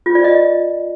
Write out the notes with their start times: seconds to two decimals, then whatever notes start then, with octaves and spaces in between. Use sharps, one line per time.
0.06 F4
0.15 D5
0.24 D#5